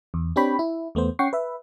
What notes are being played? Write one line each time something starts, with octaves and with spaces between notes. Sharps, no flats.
E2
C4 D4 G4 C#5 G5 B5
E4
E2 A3 B3 C5
C#4 F#5 G5 C#6 C7
B4 E5